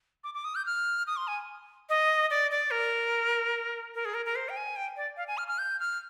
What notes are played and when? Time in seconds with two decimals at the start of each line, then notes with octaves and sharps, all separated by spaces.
0.24 D6
0.34 D6
0.45 D#6
0.55 G6
0.66 F6
1.07 D#6
1.17 C6
1.27 G#5
1.89 D#5
2.30 D5
2.51 D5
2.71 A#4
3.95 A#4
4.05 G#4
4.14 A#4
4.26 A#4
4.36 C5
4.49 G5
4.57 G#5
4.76 G5
4.97 D5
5.17 F5
5.28 G#5
5.38 F6
5.48 F6
5.58 G6
5.80 F6